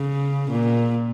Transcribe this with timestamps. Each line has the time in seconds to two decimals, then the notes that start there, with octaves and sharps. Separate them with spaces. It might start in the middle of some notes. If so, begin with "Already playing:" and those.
Already playing: C#3
0.51 A#2